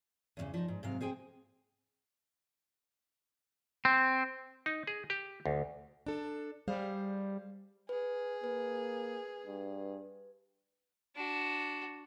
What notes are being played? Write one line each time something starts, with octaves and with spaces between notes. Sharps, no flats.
E2 A2 C#3
F3 D#4
G#2
G#2 C3 F#3 F5
C4 G#4 C5 G5
C4
D#4
G#4
G4
D2
D4 A4
G3 G#4 C5 F5
G#4 B4
A#3 B4
G2
D4 F#4